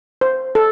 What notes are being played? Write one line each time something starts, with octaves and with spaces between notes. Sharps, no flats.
C5
A4